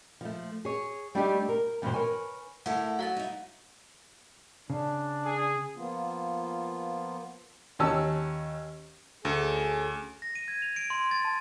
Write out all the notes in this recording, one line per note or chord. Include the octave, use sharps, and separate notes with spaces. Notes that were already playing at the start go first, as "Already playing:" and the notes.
F3 A3
G#4 C#5
G3 A3 D4 D#4 G4
A#4
E2 G2 B2 D#3 E3 C5
A#4 B4 C#5 G#5
A2 E4 A4 A#4 F#5
F#3 F5 F#5 A6
D#4 E4
C#3 D4
G#4
F3 A#3 B3 F4
D#2 C#4 A5 E6
D2 C#4 G#4 A4
A#6
D#7
G#6
F7
D7
C6
A6
A5